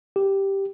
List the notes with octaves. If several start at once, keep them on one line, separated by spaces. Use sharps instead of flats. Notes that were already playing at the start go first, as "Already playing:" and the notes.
G4